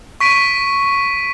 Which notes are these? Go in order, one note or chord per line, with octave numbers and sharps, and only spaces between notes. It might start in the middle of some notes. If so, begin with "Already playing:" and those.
C#6 B6 D7 D#7